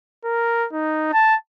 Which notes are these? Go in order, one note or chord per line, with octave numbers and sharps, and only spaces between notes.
A#4
D#4
A5